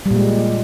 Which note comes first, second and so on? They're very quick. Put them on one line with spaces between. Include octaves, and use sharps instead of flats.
G3 A#2 G#3